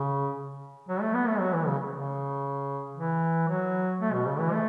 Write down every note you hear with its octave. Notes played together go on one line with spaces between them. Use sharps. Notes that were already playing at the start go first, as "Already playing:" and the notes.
Already playing: C#3
F#3
A3
B3
A3
F#3
E3
C#3
C#3
E3
F#3
A3
B2
C#3
E3
A3